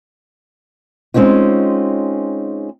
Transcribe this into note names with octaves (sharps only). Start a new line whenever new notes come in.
G#3 C4 C#4 D#4 F4